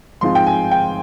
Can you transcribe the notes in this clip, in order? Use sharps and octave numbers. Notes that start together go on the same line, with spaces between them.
G#2 F3 G#3 C4 F4 C6
G5
G#5
G5